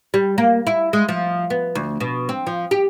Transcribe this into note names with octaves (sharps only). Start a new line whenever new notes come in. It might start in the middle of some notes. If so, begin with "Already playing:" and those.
G3
A#3
E4
G#3
F3
B3
D2
B2
C4
F3
G4